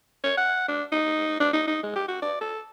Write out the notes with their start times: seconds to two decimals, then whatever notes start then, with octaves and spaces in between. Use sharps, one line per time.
0.24 C#5
0.37 F#5
0.68 D4
0.92 D#4
1.40 D4
1.53 D#4
1.67 D#4
1.83 G#3
1.96 G4
2.08 F#4
2.22 D5
2.41 A4